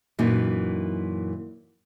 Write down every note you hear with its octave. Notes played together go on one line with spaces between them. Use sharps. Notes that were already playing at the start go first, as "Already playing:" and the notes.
F#2 A#2 E3 D#4